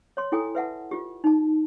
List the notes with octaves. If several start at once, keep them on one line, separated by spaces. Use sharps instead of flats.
C#5 C6
E4 A4 G5 G#5 D#6
B4 E5 F#5 A5
F4 G4
D#4 A5